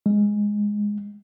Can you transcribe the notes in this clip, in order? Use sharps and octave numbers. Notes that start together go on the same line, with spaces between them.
G#3